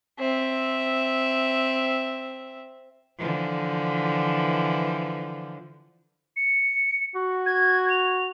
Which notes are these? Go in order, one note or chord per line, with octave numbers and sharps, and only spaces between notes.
C4 E5
D3 E3 F3
C#7
F#4
G#6
F7